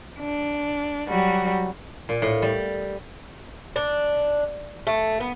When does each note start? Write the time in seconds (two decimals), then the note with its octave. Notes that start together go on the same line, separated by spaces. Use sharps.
0.19 D4
1.08 F#3 G3 F#4
2.09 A#2
2.22 A2
2.42 G3
3.76 D4
4.87 A3
5.20 B3